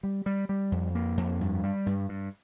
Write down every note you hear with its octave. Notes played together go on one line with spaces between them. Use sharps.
G3
G3
G3
F2
A#3
F2
G2
G3
G2
G2